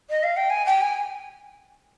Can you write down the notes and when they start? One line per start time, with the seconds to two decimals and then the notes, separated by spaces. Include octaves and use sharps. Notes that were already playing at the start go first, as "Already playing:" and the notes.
0.10 D#5
0.23 F5
0.37 G5
0.50 G#5
0.66 G5
0.81 G#5